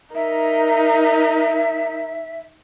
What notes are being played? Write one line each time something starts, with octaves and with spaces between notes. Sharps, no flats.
D#4 A#4 E5